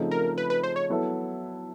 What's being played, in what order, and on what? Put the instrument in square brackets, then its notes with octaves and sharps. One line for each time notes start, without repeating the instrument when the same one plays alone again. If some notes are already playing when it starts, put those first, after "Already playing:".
Already playing: [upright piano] C#3 F3 A3 C4 D#4
[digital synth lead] A#4
B4
B4
C5
C#5
[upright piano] F#3 B3 E4 A4